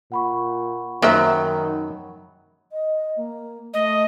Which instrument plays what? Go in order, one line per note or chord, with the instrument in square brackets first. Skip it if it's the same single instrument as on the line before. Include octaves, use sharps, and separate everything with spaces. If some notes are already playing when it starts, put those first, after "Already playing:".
[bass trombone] A#2 [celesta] F#5 B5 C#6
[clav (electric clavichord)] F#2 F#3 B3 [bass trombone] D#3 [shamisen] A#3 C5 E5
[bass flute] D#5
A#3
[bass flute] A3 [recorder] D#5